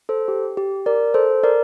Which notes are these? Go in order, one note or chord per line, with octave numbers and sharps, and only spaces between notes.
A4 C5
G4
G4
A#4 D5
A4 C5
A#4 D5